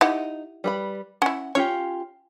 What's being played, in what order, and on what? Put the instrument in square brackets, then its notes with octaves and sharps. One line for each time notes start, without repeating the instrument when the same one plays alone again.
[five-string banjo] D#4 [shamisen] E4 G4 F#5
[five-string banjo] G3 B4 B5
[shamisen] C#4 E4 [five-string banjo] F#5
[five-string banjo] C#4 F4 G4 [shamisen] C#5